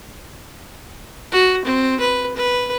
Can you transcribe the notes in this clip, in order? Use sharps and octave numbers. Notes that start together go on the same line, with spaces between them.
F#4
C4
B4
B4